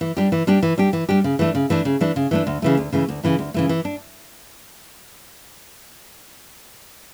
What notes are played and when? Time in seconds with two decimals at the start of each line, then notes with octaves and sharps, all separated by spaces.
0.01 E3
0.17 G3 D4 G4
0.32 E3
0.47 G3 D4 G4
0.63 E3
0.78 G3 D4 G4
0.93 E3
1.09 G3 D4 G4
1.24 C#3
1.39 E3 A3 D4
1.55 C#3
1.70 E3 A3 D4
1.85 C#3
2.01 E3 A3 D4
2.16 C#3
2.31 E3 A3 D4
2.47 D2
2.62 C#3 E3 A3
2.77 D2
2.92 C#3 E3 A3
3.09 D2
3.23 C#3 E3 A3
3.39 D2
3.54 C#3 E3 A3
3.69 E3
3.85 D4